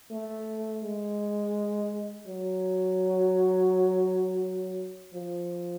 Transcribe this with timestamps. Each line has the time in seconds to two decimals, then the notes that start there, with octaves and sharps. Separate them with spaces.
0.11 A3
0.83 G#3
2.27 F#3
5.14 F3